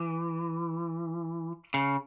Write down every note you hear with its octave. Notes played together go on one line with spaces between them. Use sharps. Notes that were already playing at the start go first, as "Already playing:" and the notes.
Already playing: E3
C#3